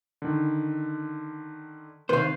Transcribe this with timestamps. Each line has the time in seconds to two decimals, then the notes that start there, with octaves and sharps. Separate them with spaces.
0.22 D3 D#3
2.09 C3 D#3 B4 C5 F5